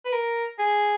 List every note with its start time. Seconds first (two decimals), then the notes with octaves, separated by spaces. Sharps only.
0.05 B4
0.12 A#4
0.59 G#4